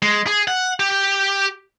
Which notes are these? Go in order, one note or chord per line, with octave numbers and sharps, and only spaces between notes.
G#3
G#4
F#5
G4